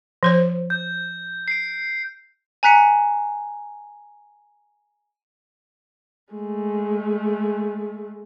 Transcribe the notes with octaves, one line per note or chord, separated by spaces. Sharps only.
F3 C5 C#5
G6
C7 D7
G#5 A#5 F#6 B6 C#7
G#3 A3